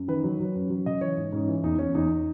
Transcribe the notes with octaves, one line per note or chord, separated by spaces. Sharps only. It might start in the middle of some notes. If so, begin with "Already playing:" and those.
Already playing: F#2
D#3 B4
F#3
F#3
F#2
F#3
C#3 D#5
E3 C#5
G#2
G#2 C#4
E3
E2 D#4
E2 C#4
E2 D#4